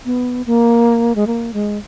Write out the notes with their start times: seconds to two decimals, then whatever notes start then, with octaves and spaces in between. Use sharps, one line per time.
0.05 B3
0.47 A#3
1.15 G#3
1.27 A#3
1.54 G#3